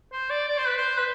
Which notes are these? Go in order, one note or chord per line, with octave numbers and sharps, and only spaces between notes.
C5
D5
D5
C5
B4
C5
B4